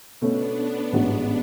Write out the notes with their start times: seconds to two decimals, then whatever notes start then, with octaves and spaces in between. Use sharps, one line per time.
0.21 B2 A3 B3 C#4 D4
0.93 A1 G#2 F#3 C#4 F#4